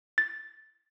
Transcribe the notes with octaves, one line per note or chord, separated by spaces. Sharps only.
A6